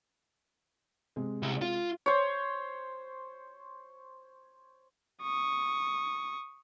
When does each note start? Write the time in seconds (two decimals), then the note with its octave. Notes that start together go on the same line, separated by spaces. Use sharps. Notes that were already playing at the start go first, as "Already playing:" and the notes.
1.16 C3 G#3
1.42 C2
1.62 F4
2.06 C5 C#5
5.22 C#6 D#6